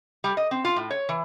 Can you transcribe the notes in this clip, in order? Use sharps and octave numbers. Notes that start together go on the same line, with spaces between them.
G3
D#5
C4
F4
A2
C#5
E3